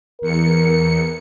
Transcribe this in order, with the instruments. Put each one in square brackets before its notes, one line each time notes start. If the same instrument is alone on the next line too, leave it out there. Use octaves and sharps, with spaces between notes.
[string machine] E2 C#7 [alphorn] A#4